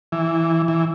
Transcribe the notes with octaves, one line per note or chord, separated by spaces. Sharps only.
E3
E3